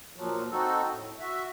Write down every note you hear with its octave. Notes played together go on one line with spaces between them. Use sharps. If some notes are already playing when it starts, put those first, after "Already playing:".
A#2 F3 F#3
C4 D#4 F#4 A4
A2
F#4 E5